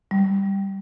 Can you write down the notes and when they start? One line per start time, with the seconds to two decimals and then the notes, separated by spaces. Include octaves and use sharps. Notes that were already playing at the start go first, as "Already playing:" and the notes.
0.11 G3